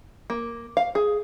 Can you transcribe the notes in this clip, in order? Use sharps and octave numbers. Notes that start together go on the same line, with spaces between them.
A#3
F5
G#4